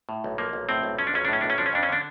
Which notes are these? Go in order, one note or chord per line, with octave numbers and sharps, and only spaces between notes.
A2
B1
F3 A#3
B1
A2 C4
B1
F3 C#4
D4
B1 C#4
D4
A2 C#4
B1 D4
C#4
F3 D4
C#4
F2 D4
C#4
D3 D4